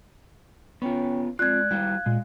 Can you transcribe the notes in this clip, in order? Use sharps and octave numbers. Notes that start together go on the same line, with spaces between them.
B3 C#4 F4 C#5 G5
G#3 C4 F4 D5 F#6 G#6
G3 E4 F#4 F5
A#2 G#3